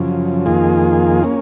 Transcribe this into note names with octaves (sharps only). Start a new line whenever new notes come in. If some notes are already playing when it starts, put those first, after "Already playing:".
Already playing: F#2 C#3 F3
F2 D#3 A#3 F4 G#4
A#3 C#4